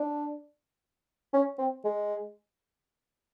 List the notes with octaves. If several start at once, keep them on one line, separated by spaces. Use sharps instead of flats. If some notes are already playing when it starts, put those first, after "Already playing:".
Already playing: D4
C#4
C4
G#3